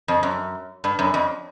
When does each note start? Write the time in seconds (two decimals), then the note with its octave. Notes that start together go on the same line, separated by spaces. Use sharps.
0.08 F2
0.23 F#2
0.84 G2
0.99 F#2
1.14 F2